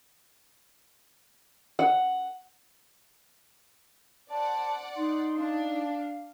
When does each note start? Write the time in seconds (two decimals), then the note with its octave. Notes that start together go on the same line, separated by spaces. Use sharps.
1.79 F#5
4.30 C5 D5 F#5 A5
4.96 D#4 C6
5.38 D4 F5